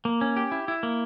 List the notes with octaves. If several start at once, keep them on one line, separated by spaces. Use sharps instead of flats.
A#3
C#4
G4
E4
E4
A#3